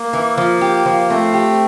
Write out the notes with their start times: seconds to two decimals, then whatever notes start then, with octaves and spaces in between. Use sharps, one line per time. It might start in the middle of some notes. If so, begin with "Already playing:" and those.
Already playing: A#3
0.13 E3
0.38 F3
0.61 G4
0.86 F3
1.10 A3 C4
1.34 G4